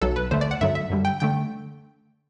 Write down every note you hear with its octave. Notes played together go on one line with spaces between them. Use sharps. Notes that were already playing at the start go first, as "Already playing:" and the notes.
B1 B2 F#3 A4
B4
D2 D3 A3 C5
D5
F#5
G2 D3 F#3 E5
E5
F#2 D3 G3
G5
D3 A3 G5